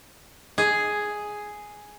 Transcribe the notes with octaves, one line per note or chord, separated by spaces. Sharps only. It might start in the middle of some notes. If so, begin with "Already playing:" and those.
G#4